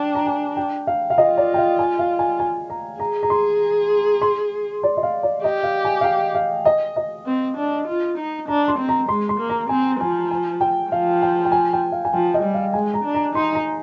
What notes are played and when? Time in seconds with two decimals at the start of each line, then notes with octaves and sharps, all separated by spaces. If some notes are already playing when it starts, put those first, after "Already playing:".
Already playing: D4 G5
0.15 A#5
0.26 G#5
0.57 G5
0.87 F5
1.10 F5
1.17 F4 D#5
1.37 D5
1.54 G5
1.58 F5
1.79 G#5
1.99 F5
2.19 G#5
2.40 G#5
2.70 A#5
3.00 G#4 A#5
3.23 A#5
3.30 C6
4.22 C6
4.83 D5
4.97 D#5
5.03 F5
5.23 D5
5.44 G4 D#5
5.63 F5
5.85 G#5
6.01 F5
6.04 G5
6.35 F5
6.65 D#5
6.96 D#5
7.26 C4
7.57 D4
7.87 F4
8.18 D#4
8.48 D4 A#5
8.68 C6
8.78 C4
8.89 A#5
9.09 G#3 C6
9.29 C6
9.39 A#3
9.50 A#5
9.69 C4 G#5
10.00 F3 G#5
10.31 G#5
10.61 G5
10.91 F3 F5
11.22 G5
11.45 G5
11.52 G#5
11.73 G5
11.92 F5
12.05 G#5
12.13 F3 G5
12.34 D#5
12.43 G3
12.54 F5
12.73 G#3 G#5
12.94 A#5
13.04 D4
13.15 A#5
13.35 D#4 C6
13.55 A#5